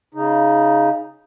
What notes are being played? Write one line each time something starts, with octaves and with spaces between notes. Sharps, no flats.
C#3 D#4